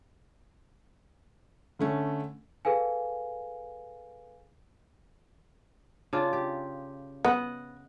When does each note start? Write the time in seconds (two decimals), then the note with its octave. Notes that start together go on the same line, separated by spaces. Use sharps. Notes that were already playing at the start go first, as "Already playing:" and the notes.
1.79 D3 A3 C#4
2.65 G#4 A4 B4 F5 G#5
6.13 C#3 D4 F4
6.33 G4
7.25 B3 D#5 F#5